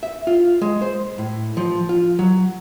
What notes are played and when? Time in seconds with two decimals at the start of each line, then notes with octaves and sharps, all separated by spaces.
0.03 E5
0.27 F4
0.62 G#3
0.82 C5
1.18 A2
1.57 F3
1.89 F4
2.19 F#3